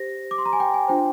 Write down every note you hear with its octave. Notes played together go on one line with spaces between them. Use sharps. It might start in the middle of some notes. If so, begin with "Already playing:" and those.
Already playing: G4 C5 A#6
D6
C6
A#5
G#5
G5
G#5
D4 F4 C5 G5